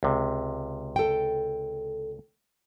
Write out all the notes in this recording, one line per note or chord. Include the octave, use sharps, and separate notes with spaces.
C#2 C3
A4 G5